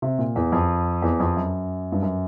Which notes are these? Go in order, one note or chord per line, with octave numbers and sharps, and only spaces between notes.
C3
A#2
E2
F2
E2
F2
F#2
G2
F#2